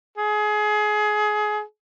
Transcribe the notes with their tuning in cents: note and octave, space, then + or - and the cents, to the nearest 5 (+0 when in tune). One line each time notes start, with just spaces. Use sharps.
G#4 +25